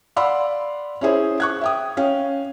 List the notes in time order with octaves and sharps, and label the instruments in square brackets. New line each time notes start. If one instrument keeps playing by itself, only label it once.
[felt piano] D5 F5 F#5 B5 C6 E6
C#4 E4 G#4 C5
C#6 F#6 G#6
E5 G5 D#6
C#4 F5 G5